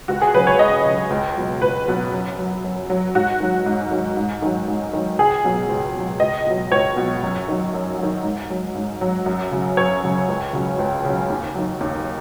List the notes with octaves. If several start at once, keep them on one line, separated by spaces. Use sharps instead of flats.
C#2 F#4
G#4
C#3 F#3 B4
C#5
C#2 D#5
C#3 F#3
C#2
B2 F#3
C#2 B4
B2 F#3
F#2
F#3
F#2
F#3
G#2 F#4
D#3 F#3
G#2
D#3 F#3
G#2
D#3 F#3
G#2
D#3 F#3
C#2 G#4
B2 F#3
C#2
B2 F#3
C#2 D#5
B2 F#3
C#2 C#5
B2 F#3
F#2
D#3 F#3
F#2
D#3 F#3
G#2
F#3
G#2
F#3
F#2
C#3 F#3
F#2 C#5
C#3 F#3
C#2
C#3 F#3
C#2
C#3 F#3
D#2
D#3 F#3
D#2